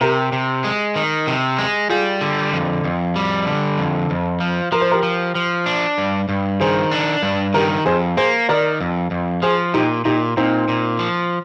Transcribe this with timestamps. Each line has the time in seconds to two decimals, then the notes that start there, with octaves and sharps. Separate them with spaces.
0.01 C3 G4 A#4
0.32 C3
0.64 G#3
0.96 D#3
1.27 C3
1.59 G#3
1.89 G3 F4 G#4
2.21 D3
2.53 F2
2.84 F2
3.16 G3
3.47 D3
3.78 F2
4.10 F2
4.40 F3
4.72 F3 A#4
4.81 C5
4.91 G4 A#4
5.03 F3
5.35 F3
5.66 D4
5.98 G2
6.29 G2
6.60 D#3 G#4 C5
6.92 D4
7.23 G2
7.54 D#3 G4 A#4
7.85 F2 G#4 C5
8.17 A#3 G#4 C5
8.49 D#3 A#4 D5
8.81 F2
9.11 F2
9.42 F3 G#4 C5
9.74 A#2 D#4 G4
10.05 A#2 D#4 G4
10.37 A#2 C4 D#4
10.68 A#2
10.99 F3